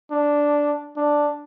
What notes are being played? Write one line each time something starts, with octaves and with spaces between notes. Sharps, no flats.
D4
D4